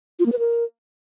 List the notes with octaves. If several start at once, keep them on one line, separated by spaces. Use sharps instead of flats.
F4
A#3
B4
A#4